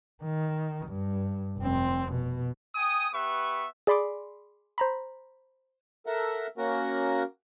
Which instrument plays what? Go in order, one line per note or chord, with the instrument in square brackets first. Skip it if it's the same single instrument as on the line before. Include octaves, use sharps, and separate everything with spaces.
[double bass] D#3
G2
F1 C4
B2
[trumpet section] G5 G#5 D#6
B3 G4 B4 E5 C#6
[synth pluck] G#4 D5 B5 C6 D6
C5 A#5 B5
[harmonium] A4 A#4 E5 F#5
A#3 C#4 F#4 A#4 F#5